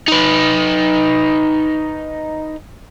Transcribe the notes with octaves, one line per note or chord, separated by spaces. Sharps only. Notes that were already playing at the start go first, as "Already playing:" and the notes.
D#4 B4